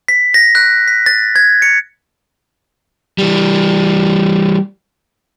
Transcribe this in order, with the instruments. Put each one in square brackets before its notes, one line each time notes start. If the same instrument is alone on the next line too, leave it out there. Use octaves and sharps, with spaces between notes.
[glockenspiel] B6
A#6
F#6
B6
A6
G#6
C#7
[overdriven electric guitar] E3 G3